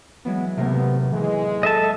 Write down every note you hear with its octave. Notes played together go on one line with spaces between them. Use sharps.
E3 F#3 G#3 B3
D#2 A2 C3 B3 A#4
E3 G#3
A4 D#5 E5 A5